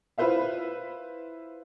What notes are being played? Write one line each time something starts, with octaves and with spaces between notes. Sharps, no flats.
E4 F4 B4 C5 E5 F5